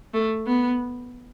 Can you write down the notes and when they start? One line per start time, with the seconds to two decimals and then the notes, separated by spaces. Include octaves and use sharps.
0.14 A3
0.47 B3